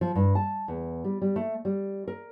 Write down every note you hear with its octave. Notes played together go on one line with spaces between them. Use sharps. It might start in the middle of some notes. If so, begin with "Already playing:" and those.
F3
G2
A5
E2
G3
G3
A3
G3
A#4